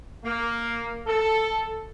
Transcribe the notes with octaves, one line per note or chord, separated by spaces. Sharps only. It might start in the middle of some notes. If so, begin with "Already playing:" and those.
A#3
A4